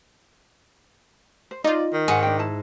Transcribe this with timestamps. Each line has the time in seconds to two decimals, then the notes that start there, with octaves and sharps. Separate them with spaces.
1.51 C5
1.64 D#4 F4 D5 D#5
1.93 D#3
2.08 G#2 F#5 G#5
2.23 D4 G5
2.39 E4 A5